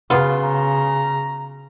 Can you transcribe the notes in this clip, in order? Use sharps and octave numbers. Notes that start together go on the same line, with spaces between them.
C#3 F#3 B3 F4
A#5